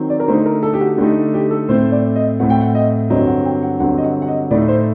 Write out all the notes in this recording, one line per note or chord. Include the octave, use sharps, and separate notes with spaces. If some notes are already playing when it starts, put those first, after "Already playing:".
Already playing: D#3 F#3 C4
D5
A#4
D3 A3 D#4 C5
A#4
A4
G4
F#4
D3 A3 D#4 G4
G4
A4
A2 A3 C4 C5
D5
D#5
A2 A3 C4 F#5
G5
F#5
D#5
G2 D3 F#3 C4 D#5
F#5
G5
F#5
G2 D3 F#3 C4 F#5
D#5
F#5
F#5
D#5
A2 A3 D#4 D5
C5